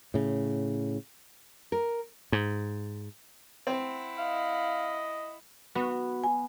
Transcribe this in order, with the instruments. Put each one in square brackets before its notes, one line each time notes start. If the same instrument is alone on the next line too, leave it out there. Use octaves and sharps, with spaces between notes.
[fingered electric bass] A2 C#3
[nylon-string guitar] A#4
[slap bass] G#2
[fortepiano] C4 [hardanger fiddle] E4 F#5
[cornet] D#5 [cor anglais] F5
[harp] B3 [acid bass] F#4
[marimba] G#5